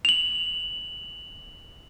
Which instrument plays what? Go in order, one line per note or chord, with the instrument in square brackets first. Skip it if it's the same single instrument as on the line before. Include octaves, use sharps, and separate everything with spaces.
[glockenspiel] F7 F#7